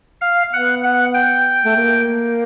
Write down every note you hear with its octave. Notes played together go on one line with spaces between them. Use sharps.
F5
B3 F#5
F#5
G5
A3
A#3